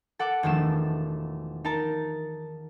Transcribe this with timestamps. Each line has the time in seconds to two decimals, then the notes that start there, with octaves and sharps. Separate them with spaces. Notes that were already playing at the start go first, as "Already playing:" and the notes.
0.19 A4 F#5 D6
0.43 E1 D#3 F3 A3 E7
1.65 D#4 A#4 A5 A#5